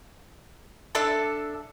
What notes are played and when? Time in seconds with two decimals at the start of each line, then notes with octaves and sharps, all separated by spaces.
0.95 D4 A4 E5 A5